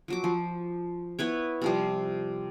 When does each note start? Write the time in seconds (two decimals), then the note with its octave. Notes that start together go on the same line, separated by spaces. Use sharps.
0.08 F3 F#3 D6
0.24 F3
1.19 B3 E4 B4 C#5
1.62 C3 F3 G3